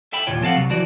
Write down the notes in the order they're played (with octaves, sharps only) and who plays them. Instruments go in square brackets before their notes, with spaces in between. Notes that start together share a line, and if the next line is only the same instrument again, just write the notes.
[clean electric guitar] A4 E5 G5 A5 B5
D#2 A#2 F4 C#5 G5
F3 C4 A4 F5 F#5
C2 F#3
E3 F3 F#4 D5